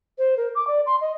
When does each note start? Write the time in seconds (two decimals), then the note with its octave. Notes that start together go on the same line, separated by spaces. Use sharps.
0.18 C5
0.37 A#4
0.55 D6
0.67 D5
0.86 C6
1.01 D#5